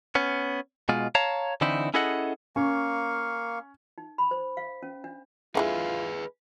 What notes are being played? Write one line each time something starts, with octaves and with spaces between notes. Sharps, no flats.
B3 C#4
B2 G#3 F4
C#5 F5 A5 A#5
D3 E3 C4 D#4 E4
C#4 E4 G#4 A4 D#5 F#5
A#3 C#4 F5 C#6
D#4
B5
C5
F5
C#4
D4
D3 E3 G#3 F4 G#4 B4